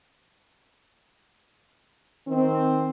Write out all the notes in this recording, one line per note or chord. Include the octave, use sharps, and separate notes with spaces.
D#3 C4